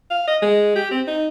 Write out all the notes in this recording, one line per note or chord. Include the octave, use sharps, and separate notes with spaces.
F5
D#5
G#3
G4
C4
D#4